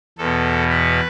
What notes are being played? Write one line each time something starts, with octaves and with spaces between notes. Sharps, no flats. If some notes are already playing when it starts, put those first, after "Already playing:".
E2 B2 A4
B4